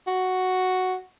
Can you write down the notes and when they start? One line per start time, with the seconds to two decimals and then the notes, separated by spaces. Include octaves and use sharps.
0.07 F#4